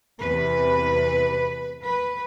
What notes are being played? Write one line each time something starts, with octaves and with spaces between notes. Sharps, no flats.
E2 C3 E3 B4
B4